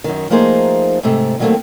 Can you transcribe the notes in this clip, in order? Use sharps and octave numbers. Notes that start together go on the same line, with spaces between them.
F#2 D#3
F3 A3 A#3 D#4 G#4 C5
G#2 C3 A3
D#3 F#3 G3 A3 A#3 C4